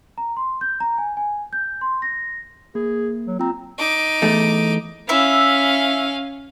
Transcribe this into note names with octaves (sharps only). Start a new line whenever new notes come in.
A#5
C6
G6
A#5
G#5
G#5
G6
C6
A#6
A#3 G#4
F#3
C4 F4 A#5
D#4 D6
E2 A3
C#4 E4 E5 F5